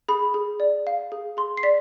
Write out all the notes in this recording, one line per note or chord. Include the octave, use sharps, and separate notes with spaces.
G#4 B5
G#4
D5
F5
G#4
G#4 C6
C7
D5 B6